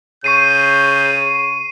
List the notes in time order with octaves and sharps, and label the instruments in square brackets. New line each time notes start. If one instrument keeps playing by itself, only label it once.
[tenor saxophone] C#3 [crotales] C#6 C7 D#7 [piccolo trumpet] G6